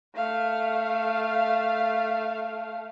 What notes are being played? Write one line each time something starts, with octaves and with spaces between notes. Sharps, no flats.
A3 F5